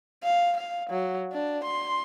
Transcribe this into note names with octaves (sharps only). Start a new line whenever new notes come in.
F5
F5
F#3
D4
C6